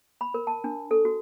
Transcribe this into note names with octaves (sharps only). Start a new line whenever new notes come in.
B5
A#4
A5
D4
A4
F#4